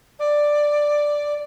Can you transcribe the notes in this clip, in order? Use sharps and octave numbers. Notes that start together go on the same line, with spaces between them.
D5